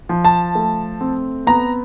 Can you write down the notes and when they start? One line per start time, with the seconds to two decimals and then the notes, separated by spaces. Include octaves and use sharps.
0.09 F3
0.25 A5
0.55 A3
1.01 C4
1.47 B3 A#5